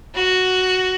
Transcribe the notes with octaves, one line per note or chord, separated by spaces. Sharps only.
F#4